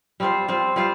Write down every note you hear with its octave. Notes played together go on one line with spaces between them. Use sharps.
G3 C4 F4 C5
G3 C4 F4 C5
G3 C4 F4 C5